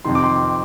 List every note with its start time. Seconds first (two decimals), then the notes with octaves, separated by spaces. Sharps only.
0.05 F2 C3 D#3 C6
0.15 D6
0.24 C6